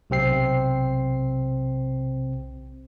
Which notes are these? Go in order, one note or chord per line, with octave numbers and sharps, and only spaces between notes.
B1 C3 C4 C7